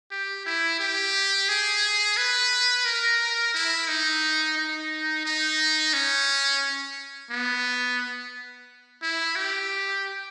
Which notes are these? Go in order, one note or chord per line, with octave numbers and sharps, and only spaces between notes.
G4
E4
G4
G#4
B4
A#4
E4
D#4
D#4
D#4
C#4
B3
E4
G4